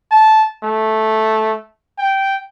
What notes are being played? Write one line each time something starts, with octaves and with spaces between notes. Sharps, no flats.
A5
A3
G5